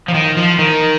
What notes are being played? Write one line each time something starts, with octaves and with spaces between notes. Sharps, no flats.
F3
D#3
F3
D#3